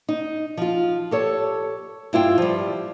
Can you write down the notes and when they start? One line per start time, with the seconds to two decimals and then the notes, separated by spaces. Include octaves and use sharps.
0.09 D#4
0.57 F3 F4
1.11 G4 A4 C#5
2.13 G2 E4 F4 G5
2.38 F3 G3